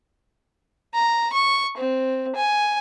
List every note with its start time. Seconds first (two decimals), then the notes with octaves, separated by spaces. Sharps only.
0.94 A#5
1.32 C#6
1.77 C4
2.35 G#5